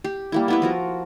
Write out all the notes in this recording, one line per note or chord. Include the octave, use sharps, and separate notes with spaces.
G4
G3 A#3 E4
B3 E4 B4
F3 F#4 A#4